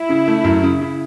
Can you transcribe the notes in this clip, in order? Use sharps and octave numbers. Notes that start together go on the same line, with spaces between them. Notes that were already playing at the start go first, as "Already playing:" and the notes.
Already playing: E4
C#3
A3
F#2
C#3
C#3